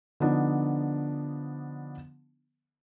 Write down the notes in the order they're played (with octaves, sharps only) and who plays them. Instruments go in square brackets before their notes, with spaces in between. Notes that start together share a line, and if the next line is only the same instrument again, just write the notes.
[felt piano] D3 F3 B3 D4 D#4